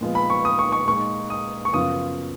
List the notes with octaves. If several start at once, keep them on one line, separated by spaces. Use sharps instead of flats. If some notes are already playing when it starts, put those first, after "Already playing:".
A#2 F3 G#3 B3 F4
B5
C#6
D#6
C#6
C#6
A#2 G#3 D#4 C#6
D#6
C#6
F#2 C#3 F3 B3 F4 D#6